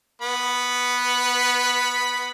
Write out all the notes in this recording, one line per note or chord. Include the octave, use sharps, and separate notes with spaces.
B3 B5